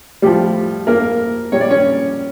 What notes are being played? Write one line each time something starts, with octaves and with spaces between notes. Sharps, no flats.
A2 F3 G3 G4
A#3 A#4
A#2 G3 C#5
D5
C#4 C#5